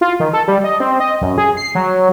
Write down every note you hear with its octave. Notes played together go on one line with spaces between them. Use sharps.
F4
D#3
A4
G3
D#5
C4
D#5
F#2
G#4
C7
F#3